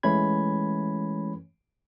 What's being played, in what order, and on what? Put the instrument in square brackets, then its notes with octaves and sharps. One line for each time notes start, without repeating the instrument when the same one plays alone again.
[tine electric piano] E3 G#3 A3 C#4 B5 G#6